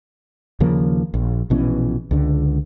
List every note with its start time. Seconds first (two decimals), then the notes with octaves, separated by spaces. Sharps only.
0.60 D#2 C#3 F3 A#3
1.14 A#1
1.50 A#1 B2 E3 C#4
2.11 C#2 D3